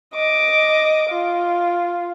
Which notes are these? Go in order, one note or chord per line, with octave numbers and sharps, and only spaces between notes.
D#5 D6
F4